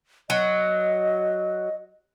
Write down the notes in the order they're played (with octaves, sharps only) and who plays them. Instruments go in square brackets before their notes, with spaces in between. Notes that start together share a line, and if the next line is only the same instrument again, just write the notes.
[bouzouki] F#3 [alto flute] D#5